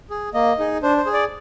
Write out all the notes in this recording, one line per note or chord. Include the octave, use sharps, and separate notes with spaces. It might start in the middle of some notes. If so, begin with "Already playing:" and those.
G#4
A#3 D#5
D#4 G#4
D4 C5
C5
G#4
D5